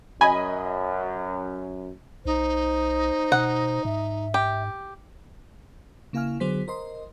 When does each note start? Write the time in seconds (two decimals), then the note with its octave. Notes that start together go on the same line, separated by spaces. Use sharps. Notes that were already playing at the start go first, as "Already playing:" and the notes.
0.21 F#2 D#5 G#5 B5
2.26 B1 D#4 C5
3.32 B2 F#5
3.85 G#2 E5
4.34 G4
6.13 C#3 A#3 E4 F5 G#5 F6
6.40 D3 F#3 B3 G#4 C5 B6
6.68 A#4 C5 D#5 C6